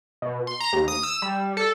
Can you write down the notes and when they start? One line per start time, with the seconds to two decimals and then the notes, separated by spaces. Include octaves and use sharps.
0.22 B2
0.47 C6
0.60 A#5
0.73 D#2
0.88 D#6
1.03 E6
1.22 G3
1.57 A4